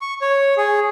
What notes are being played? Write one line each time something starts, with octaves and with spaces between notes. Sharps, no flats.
C#6
C#5
G#4